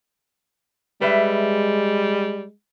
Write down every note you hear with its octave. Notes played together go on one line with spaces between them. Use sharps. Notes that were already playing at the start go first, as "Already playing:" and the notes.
G3 G#3 B4 E5